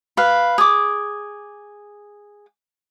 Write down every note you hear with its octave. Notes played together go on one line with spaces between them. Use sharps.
B4 F5
G#4 D6